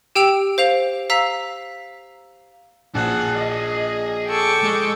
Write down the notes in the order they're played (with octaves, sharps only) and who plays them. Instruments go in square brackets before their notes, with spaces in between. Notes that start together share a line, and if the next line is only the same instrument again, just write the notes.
[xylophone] G4 G5 E6 D7 F7
C5 F5 F7
F5 A#5 E6 B6
[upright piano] A#1 [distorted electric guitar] G#4 A5 [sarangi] F#5
[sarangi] D#5
[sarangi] A4 [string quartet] G5 C#6 D6
[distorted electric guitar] G#3